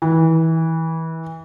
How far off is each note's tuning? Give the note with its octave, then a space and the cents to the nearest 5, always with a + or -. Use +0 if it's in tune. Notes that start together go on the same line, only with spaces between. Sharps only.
E3 -25